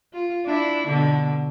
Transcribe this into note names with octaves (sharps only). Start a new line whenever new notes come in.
F4
D4 E4
B2 D3